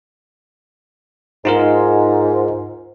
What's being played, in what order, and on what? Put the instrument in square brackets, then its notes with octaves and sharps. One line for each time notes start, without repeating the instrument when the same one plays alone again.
[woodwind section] G#2 [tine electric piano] D#4 F4 A#4